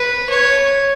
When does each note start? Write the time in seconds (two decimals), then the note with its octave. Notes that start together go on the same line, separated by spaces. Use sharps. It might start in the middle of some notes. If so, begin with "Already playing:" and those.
Already playing: B4
0.29 C#5